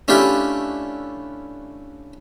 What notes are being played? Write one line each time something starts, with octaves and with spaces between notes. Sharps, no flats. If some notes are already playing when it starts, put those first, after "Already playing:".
A3 C#4 D4 E4 F4 G4